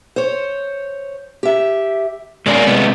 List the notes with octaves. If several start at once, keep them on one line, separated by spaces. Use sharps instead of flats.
C5 C#5
G4 E5
B2 G#3 A#3 C#4 D5
C3 G#3 A3 B3 D#5